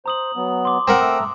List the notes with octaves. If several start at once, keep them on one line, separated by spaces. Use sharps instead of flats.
C5 A#5 D#6 F#7
F#3 B3
C6 D6
C4 A#4 F#5
A3 A#5 E6